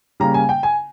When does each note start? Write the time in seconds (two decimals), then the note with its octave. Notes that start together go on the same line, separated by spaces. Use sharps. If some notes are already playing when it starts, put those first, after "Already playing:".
0.20 C#3 G3 A#3 A#5
0.34 G#5
0.49 G5
0.63 G#5